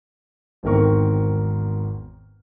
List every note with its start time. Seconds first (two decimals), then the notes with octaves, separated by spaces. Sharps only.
0.63 G#1 E2 D#3 C4 A#4 C#6